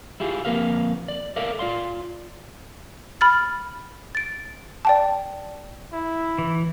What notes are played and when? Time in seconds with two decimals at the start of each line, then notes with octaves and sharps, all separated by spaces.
0.20 E4 F4 G4 G#4
0.45 F2 A#3 A#4 B4 F5
1.08 D5
1.36 A4 A#4 D5 E5 F5
1.59 F4 D5 F5 C6
3.21 B5 F6 A6
4.15 A6 D7
4.85 D5 G5 A5
5.93 E4
6.38 E3